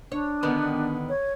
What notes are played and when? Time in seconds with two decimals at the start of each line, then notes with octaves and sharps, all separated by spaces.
0.12 D4 C#5
0.43 D3 D#3 B3
1.09 C#5